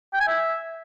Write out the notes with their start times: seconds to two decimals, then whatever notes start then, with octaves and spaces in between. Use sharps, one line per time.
0.14 G5
0.21 G#5
0.28 E5